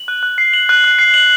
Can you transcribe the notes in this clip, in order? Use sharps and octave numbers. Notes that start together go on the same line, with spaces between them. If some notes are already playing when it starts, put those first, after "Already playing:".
Already playing: F#7
F#6
F#6
C7
F#7
F#6
F#6
C7
F#7